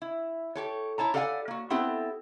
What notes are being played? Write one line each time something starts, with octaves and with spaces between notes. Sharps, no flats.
E4
G4 A4 C#5
E4 C#5 A5 A#5
G4 A4 D5 F5 F#5 G#5
A#3 F#4
B3 C4 E4 G4 A4